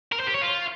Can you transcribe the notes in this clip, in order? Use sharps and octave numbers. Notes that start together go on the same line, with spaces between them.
A#4
C5
G4
C#5
F4